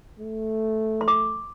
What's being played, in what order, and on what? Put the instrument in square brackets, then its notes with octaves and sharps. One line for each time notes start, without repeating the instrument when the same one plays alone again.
[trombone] A3
[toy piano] C6
D6